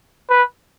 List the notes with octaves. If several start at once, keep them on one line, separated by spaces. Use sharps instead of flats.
B4